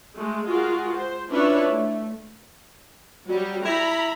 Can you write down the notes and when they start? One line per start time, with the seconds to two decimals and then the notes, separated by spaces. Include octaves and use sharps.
0.14 G#3 A3
0.45 G#3 F4 F#4 G#4 A#4
0.94 C5
1.29 C#4 D4 E4 F4 B4 C#5
1.68 A3
3.28 F#3 G3
3.65 E4 A#5 B5